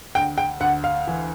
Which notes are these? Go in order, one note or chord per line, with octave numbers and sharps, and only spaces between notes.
D2 G5
G5
D2 F#5
F5
E3